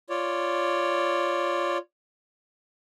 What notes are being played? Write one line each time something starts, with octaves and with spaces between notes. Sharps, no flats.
F4 C#5 D5